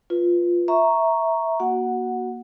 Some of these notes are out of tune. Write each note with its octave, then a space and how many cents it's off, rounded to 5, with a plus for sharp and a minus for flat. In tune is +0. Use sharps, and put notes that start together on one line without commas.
F4 +0 B4 +0
E5 -5 A#5 +0 C#6 +0
A#3 +30 F#4 +0 F#5 -5